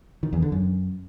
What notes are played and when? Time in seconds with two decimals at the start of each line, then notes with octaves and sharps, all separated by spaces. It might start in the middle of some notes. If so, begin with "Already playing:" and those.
0.23 D#3
0.33 E2
0.42 D3
0.52 F#2